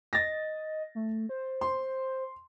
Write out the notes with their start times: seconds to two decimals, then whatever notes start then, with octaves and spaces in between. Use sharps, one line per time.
0.13 D#5 A6 A#6
0.95 A3
1.29 C5
1.61 C6